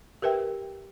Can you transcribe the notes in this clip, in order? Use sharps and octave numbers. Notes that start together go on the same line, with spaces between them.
G4 A#4 B4 E5 G5